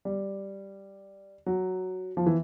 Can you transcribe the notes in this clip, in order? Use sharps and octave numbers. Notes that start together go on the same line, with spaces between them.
G3
F#3
F3
E3